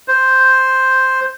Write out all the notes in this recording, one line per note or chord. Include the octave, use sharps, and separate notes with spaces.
C5